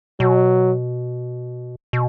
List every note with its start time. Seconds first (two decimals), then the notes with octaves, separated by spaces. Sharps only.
0.20 B2 F#3
1.93 B2